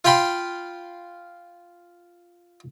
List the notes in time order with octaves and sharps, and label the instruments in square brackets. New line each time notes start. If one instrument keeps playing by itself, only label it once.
[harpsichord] F4 F5 G5 B5 C6